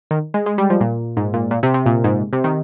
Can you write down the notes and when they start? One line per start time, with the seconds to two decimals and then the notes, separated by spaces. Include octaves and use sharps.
0.11 D#3
0.34 G#3
0.46 G#3
0.58 G3
0.70 F3
0.81 A#2
1.17 G#2
1.34 A#2
1.51 A#2
1.63 C3
1.74 C3
1.86 A#2
2.04 G#2
2.33 C3
2.44 D#3